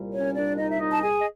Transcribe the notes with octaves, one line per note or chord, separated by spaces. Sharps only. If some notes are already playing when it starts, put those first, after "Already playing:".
Already playing: C2 A#2 G3
C#4 C#5
D4 D5
D#4 D#5
E5
D#4 D#5
A5
G#4 G#5
D#5